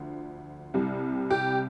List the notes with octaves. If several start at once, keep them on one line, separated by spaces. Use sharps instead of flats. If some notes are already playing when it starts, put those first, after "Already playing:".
Already playing: D2 D3 F3
C2 C3 G3
G4